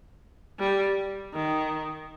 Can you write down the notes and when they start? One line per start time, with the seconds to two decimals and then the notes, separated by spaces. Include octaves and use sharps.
0.59 G3
1.34 D#3